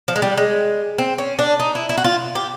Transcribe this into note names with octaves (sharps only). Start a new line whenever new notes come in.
F3
G#3
G3
G#3
C4
C#4
D4
D#4
E4
E4
F#4
F4
G4